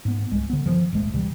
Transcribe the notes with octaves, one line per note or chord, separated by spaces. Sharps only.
G#2 B3
C2 G#3
D3 B3
G2 D#3 F3
D#1 G#1 G#3 A3
D2 C3 E3 G3